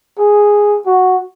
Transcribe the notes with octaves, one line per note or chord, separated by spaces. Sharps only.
G#4
F#4